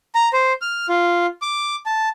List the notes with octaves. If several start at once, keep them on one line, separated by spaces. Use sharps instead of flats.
A#5
C5
F6
F4
D6
A5